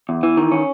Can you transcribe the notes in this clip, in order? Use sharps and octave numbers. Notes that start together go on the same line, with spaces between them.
E2
E3
D#3
C#4